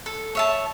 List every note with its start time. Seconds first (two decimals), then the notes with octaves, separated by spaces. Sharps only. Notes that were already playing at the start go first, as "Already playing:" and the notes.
0.06 A4
0.35 C#5 E5 A5